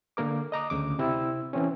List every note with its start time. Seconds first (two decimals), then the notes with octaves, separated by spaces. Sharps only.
0.17 D3 A#3 A#4 D6
0.52 D#5 A#5 D6 D#6
0.70 D2 C#3 D6
0.99 C3 C4 E4 E6
1.53 E3 C4 C#4